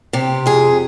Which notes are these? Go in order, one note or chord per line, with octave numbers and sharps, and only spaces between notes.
C3 G4
F2 G#4